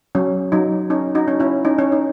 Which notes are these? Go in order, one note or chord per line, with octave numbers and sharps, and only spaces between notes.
F#3 C#4
F#3 D#4
C#4 D#4
D#4 F#4
C#4
C#4 E4
C#4 D#4
C#4
D#4